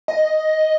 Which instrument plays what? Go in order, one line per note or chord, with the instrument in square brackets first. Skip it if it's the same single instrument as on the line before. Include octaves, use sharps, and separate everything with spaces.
[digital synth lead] D#5